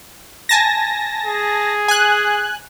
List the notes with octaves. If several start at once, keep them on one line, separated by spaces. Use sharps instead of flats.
G#5 A5 A#6
G#4
G#5 F#6